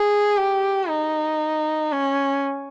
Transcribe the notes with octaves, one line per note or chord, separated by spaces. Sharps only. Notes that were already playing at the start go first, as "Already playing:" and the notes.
Already playing: G#4
G4
D#4
C#4